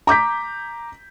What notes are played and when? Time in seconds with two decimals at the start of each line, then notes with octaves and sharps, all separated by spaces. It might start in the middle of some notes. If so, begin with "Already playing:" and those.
0.07 A#5 D6 G6 B6